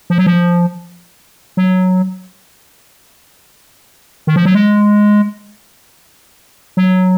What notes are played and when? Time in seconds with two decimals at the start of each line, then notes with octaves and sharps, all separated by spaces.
0.10 F3
0.18 F#3
0.26 F3
1.57 F#3
4.27 D#3
4.36 F3
4.45 F#3
4.55 G#3
6.77 F#3